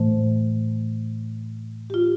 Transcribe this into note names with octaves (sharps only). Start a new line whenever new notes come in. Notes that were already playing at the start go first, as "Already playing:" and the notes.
Already playing: A2 E3 A3 C5
G4
F4